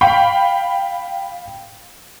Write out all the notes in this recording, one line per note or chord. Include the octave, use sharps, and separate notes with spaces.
F5 G5 B5